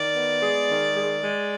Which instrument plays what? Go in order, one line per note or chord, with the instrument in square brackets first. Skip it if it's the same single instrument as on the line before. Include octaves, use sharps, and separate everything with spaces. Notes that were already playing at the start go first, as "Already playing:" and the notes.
Already playing: [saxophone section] D#3 [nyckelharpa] D5
[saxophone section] B3
G#3
D#3
G#3
G#3